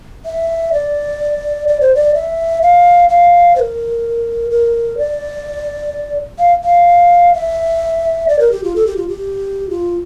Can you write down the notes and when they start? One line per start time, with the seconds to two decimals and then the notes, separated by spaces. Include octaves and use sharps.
0.26 E5
0.73 D5
1.68 D5
1.81 C5
1.95 D5
2.14 E5
2.62 F5
3.09 F5
3.55 C5
3.59 A#4
4.51 A#4
4.98 D5
6.39 F5
6.64 F5
7.34 E5
8.28 D5
8.39 A#4
8.52 G4
8.64 F4
8.76 A4
8.87 G4
8.97 F4
9.08 G4
9.70 F4